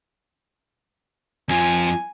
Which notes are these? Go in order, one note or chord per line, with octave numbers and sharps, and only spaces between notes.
F2 F3 G#5